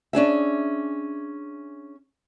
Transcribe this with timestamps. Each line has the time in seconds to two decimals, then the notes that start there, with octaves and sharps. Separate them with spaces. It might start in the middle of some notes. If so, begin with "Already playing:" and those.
0.13 C#4 D4 G#4 E5